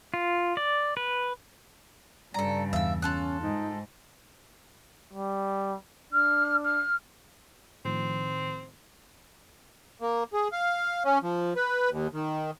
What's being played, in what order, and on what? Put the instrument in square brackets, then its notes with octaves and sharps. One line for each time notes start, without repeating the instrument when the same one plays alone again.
[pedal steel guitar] F4
D5
B4
[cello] G2 C#3 [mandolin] A4 A#5 [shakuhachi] D5
[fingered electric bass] E2 [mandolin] E5 E6 [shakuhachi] F5
[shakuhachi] C#4 [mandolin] F4 A4 F#6
[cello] G#2 [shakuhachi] D#4
[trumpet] G3
[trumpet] D4 [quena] F6
[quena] F6
[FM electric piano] A2 D#3 F3 [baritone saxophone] C4
[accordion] A#3
G#4
F5
C#4
F3
B4
D#2
D#3